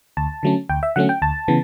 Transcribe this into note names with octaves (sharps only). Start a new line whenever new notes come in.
D2 A5
D3 F#3 A3 C#4
D2 G5
E5
D3 F#3 A3 C#4 F#5
G5
D2 A5
C#3 E3 B3